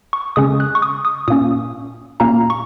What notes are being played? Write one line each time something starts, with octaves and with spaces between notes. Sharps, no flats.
C#6
C#3 G#3 C#4 D#6
F#6
C#6
D#6
D#6
A#2 A#3 C#4 D#6
A#2 A#3 C#4 A#5
C#6